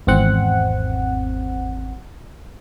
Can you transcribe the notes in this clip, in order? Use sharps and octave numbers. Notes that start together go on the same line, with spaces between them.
G#1 E2 C4 F#5